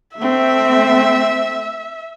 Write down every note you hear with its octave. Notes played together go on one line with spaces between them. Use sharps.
A3 C4 E5